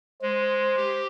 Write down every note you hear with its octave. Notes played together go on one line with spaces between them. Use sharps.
G#3 C5
G4